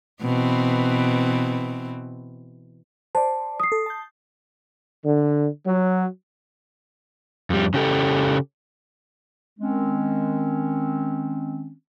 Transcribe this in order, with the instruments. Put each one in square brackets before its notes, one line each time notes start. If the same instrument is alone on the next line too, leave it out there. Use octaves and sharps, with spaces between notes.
[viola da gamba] B2 E3 C4
[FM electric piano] C5 D5 [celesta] A5
[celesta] D#6 C7
[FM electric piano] A4
A5 G6
[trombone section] D3
F#3
[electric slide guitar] F2 G3
C#3 G4 A4
[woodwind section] D#3 G#3 C4 C#4